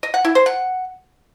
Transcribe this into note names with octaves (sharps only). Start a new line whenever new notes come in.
D#5
F#5
E4
C5
F#5